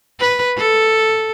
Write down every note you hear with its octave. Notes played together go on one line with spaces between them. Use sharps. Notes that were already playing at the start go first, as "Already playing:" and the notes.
B4
A4